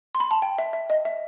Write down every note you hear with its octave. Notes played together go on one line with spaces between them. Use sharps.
C6
B5
A5
G5
E5
E5
D#5
E5